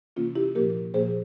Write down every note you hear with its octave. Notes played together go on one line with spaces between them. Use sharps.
C3 E3 A#3 C#4 F4
E4 G4
A#2 F3 A#3 G4 A#4
A#2 F3 A#3 G#4 C5